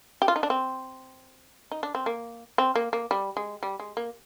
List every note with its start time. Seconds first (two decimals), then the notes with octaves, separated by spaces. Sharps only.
0.22 G4
0.28 F4
0.36 D#4
0.43 D4
0.50 C4
1.72 D#4
1.83 D4
1.95 C4
2.06 A#3
2.58 C4
2.75 A#3
2.93 A#3
3.11 G3
3.37 G#3
3.63 G3
3.79 G#3
3.97 A#3